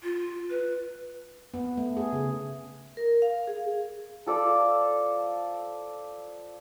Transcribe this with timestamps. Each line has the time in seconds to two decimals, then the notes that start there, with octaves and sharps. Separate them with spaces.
0.03 F4
0.50 B4
1.54 B3
1.77 A3
1.97 G#4
2.13 C#3
2.97 A#4
3.22 F5
3.47 G#4
4.26 F3 A4 D5